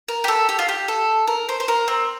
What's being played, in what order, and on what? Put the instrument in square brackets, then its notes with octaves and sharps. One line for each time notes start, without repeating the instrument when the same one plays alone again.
[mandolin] A#4
G4
A4
G4
F4
G4
A4
A#4
C5
C5
A#4
C4